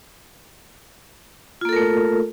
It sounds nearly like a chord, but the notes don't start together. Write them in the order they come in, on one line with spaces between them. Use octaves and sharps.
F4 A#3 A4 A#4 A3